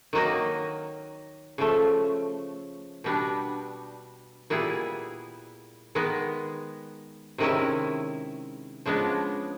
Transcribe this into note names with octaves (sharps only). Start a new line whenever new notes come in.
D#3 F#3 A#3 D#4
C#3 F3 A3
B2 G3 B3 D4
A#2 G3 B3 E4 G#4
D#3 G#3 B3
C3 D#3 G#3 C#4 E4
C#3 F3 G#3 B3 D4